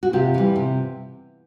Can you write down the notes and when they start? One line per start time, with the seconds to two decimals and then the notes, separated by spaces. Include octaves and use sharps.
0.03 F#4
0.13 C3 F4 G4
0.34 E3 G3
0.56 C3